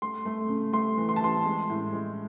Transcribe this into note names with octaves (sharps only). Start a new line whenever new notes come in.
A3 C6
A3
C#3
A3 C6
E3
C6
A5
E3 C6
G#3
A2
G#3